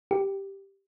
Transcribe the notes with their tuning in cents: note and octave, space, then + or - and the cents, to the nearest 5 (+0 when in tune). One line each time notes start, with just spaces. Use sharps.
G4 +0